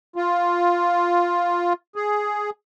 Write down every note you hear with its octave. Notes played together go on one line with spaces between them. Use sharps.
F4
G#4